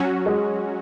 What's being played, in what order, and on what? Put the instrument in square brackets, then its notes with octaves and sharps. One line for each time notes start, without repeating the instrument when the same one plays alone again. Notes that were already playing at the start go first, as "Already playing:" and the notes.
Already playing: [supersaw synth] F#3 C#4 F#4
[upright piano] G#3